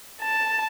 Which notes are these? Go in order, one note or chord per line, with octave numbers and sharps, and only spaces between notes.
A5